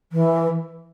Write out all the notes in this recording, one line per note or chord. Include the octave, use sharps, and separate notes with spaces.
E3